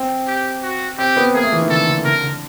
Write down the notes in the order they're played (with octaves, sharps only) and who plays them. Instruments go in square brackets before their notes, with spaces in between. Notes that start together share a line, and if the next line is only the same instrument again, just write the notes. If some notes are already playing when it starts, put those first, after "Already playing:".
Already playing: [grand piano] C4
[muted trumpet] G4
F#4
[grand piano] C4 [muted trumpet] G4
[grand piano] B3
[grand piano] A#3 [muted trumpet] G#4
[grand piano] A3
E3
D#3
[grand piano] D3 [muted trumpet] A4
[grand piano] D3
[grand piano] D3 [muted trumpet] A#4
[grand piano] D3